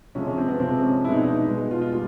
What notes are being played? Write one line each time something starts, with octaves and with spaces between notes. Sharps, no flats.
C3 F3 G#3 C#4
C#4
C4
B3
C3 F3 G#3 C4
C#4
B2 G#3 D#4 E4
D4
D#4
B2 G#3
F4
F4
G3 F4